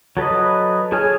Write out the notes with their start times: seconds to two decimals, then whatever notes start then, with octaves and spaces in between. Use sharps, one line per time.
0.17 F#3 A4 B4 D#5
0.92 G#4 A4 C#5 G#5 F6